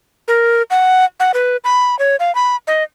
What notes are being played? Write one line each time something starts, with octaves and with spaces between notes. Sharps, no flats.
A#4
F#5
F#5
B4
B5
C#5
F5
B5
D#5